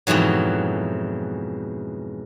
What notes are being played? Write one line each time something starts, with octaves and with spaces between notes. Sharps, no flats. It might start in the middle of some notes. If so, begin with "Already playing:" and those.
F2 G#2 B2 E3 F#3